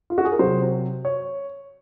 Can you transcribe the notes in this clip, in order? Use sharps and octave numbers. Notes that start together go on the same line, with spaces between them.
F4
F#4
G#4
A#4
C3 F#3 C5
C#5